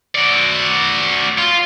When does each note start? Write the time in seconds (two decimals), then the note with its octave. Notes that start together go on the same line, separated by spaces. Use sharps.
0.15 F#4 D5
1.38 F4